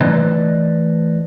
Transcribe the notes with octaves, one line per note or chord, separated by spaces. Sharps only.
E3 A3 B4 C5 D5 D#5